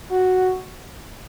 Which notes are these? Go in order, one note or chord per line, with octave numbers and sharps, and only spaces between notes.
F#4